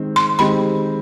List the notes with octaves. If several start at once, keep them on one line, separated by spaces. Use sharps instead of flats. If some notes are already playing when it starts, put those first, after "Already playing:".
Already playing: D#3 G#3 C4
C6
D#3 G#3 C4 G4 B5